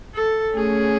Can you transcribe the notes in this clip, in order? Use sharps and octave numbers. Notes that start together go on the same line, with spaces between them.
A4
A3 C#4 G#4